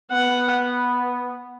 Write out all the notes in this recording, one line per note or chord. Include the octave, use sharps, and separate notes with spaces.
B3 F#5